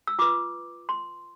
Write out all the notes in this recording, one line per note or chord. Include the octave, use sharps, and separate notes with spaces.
E6
F4 B4 D6
C6